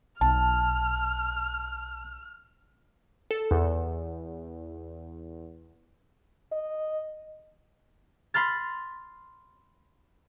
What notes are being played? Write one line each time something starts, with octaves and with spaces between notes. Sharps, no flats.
B1 A5 F6
A4
E2
D#5
B5 C6 F6 A6